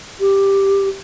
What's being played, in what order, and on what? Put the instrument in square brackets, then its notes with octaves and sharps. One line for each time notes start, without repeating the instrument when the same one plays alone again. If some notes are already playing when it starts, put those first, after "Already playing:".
[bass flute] G4